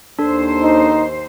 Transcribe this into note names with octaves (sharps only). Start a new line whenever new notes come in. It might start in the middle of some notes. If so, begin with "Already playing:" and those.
D#2 D4 A4 C5
D#4